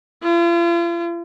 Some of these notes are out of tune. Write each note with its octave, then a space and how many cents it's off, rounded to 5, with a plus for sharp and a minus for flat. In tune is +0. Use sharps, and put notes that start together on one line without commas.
F4 -40